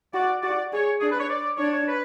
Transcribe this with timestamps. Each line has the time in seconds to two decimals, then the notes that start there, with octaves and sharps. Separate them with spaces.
0.14 F#4 D5
0.42 F#4 D5
0.72 G#4 C#5
1.01 D4 G#4
1.11 B4
1.20 C#5
1.30 D5
1.58 D4 C#5
1.72 C#5
1.88 B4